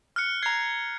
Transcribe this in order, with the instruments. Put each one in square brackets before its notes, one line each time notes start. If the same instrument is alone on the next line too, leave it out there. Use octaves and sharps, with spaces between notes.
[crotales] F6 F#6 C#7
[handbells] A#5 C7 [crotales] G#6